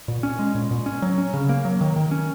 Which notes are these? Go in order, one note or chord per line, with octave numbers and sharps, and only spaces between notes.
A#2
C#4
G#3
A#2
A#2
C#4
F#3
C#4
C#3
A#3
F#3
D#3
D#3
C#4